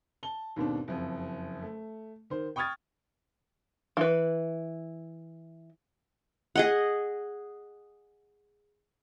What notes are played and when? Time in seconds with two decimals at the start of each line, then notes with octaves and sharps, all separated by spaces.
0.23 A5 G7
0.56 D#2 G#2 B2 C4 D4
0.88 F#1 F2
1.62 A3
2.30 D#3 C5
2.56 G5 C#6 D#6 F6 G#6 A6
3.97 E3 B4
6.55 G#4 D#5 F#5